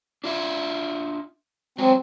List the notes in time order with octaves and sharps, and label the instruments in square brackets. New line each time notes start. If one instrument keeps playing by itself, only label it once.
[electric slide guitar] D4 F4 E5
[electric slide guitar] F#3 G#3 [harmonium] C4